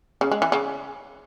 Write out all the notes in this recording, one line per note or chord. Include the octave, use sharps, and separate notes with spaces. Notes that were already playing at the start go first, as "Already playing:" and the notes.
C#3
G#3
E3
C#3